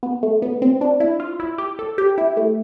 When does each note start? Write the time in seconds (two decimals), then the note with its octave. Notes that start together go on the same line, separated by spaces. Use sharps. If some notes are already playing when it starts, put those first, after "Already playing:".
0.03 B3
0.23 A3
0.42 B3
0.62 C4
0.81 D4
1.00 E4
1.20 F4
1.40 E4
1.58 G4
1.79 A4
1.98 G4
2.18 E4
2.37 A3